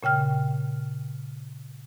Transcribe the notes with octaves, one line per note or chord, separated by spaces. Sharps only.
A#2 C#3 G5 F6